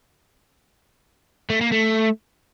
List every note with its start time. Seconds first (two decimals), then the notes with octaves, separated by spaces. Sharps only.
1.50 A3
1.61 A#3
1.72 A3